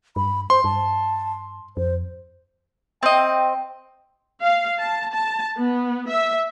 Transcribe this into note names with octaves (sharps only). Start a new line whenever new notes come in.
G2 B5
C5 C6
G2 A5
F2 C5
C4 D#5 G5
F5
A5
A5
B3
E5